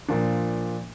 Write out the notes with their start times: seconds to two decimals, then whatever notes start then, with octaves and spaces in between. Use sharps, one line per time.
0.08 A#2 F3 D4